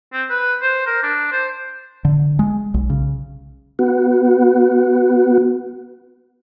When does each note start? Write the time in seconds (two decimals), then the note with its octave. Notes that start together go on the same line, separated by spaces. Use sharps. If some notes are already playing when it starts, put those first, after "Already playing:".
0.13 C4
0.30 B4
0.62 C5
0.87 A#4
1.03 D4
1.32 C5
2.05 D3
2.39 G#3
2.74 B1
2.90 C#3
3.79 B3 F#4